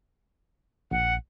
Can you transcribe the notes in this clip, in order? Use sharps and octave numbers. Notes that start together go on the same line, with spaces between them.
A#1 F#5